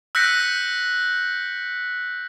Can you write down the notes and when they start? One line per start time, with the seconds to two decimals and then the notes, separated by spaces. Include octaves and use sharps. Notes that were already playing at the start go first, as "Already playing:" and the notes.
0.15 E6 F#6 G6 A#6 B6 C#7